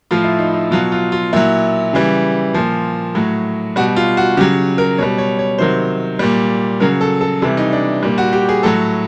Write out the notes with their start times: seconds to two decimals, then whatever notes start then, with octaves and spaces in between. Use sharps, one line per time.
0.11 A2 F3 F4
0.24 E4
0.38 D#4
0.52 E4
0.71 B2 F#3 F4
0.92 F4
1.12 F4
1.33 A#2 F#3 E4
1.93 C#3 E3 G3
2.54 A#2 F3
3.15 A2 F#3
3.76 B2 G3 F#4
3.96 F4
4.17 F#4
4.37 C#3 F#3 G4
4.78 A#4
4.98 B2 G3 C#5
5.18 C#5
5.39 C#5
5.59 C3 D#3 F#3 C5
6.19 A#2 G3
6.80 C#3 F#3 A#4
7.01 A4
7.21 A4
7.42 C3 E3 G3 A4
7.57 D#4
7.73 D4
8.03 A#2 G3
8.18 F#4
8.33 G4
8.49 G#4
8.63 A2 F#3 A4